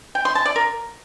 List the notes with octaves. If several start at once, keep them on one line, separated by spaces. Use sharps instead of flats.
G5
C6
A5
D5
A#4